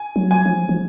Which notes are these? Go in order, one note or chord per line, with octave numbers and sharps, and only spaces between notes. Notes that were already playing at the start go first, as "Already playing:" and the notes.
Already playing: G#5
F#3
G#5
F3
F3